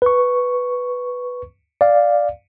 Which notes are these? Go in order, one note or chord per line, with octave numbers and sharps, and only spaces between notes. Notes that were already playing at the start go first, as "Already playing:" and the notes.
B4 C#6
D5 F5